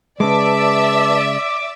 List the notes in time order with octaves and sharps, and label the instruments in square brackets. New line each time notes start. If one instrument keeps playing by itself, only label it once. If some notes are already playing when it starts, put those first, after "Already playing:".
[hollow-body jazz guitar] C#3 G#3 [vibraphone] B4 A5 [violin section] D5 E5 E6 [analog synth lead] D6